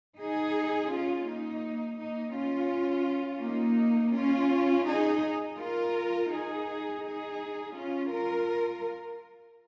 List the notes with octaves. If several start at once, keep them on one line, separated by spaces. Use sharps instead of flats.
D#4 G#4
C#4 F4
A#3 D#4
A#3 D#4
C#4 F4
A#3 D#4
C#4 F4
D#4 G#4
F4 A#4
D#4 G#4
D#4 G#4
C#4 F4
F4 A#4